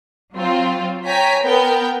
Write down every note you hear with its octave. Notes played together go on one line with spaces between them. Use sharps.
F#3 C4 F4
C#5 G5 G#5 A#5 B6
B3 A#4 G5